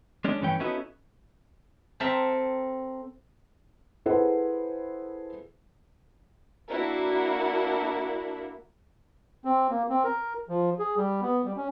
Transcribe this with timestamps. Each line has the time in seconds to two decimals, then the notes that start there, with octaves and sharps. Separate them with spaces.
0.25 G#3 C#4 D4
0.41 G2 E3 A3 C#4 G5
0.60 B3 C#4 D#4 E4 F#4 A4
2.00 C4 A4 A#4 E5
4.06 E4 G#4 A4 B4 C5 F#5
6.69 A#3 D4 E4 F#4 A#4
9.45 C4
9.70 A#3
9.90 C4
10.04 A#4
10.49 F3
10.79 G#4
10.97 G3
11.21 B3
11.45 G3
11.57 C#4